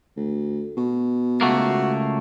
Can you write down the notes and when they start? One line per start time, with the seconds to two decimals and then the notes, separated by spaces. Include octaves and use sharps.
0.16 D2
0.77 B2
1.41 C#2 A3 A#3 F#4